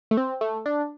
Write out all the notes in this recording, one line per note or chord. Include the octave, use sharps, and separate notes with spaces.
A3
C4
A3
D4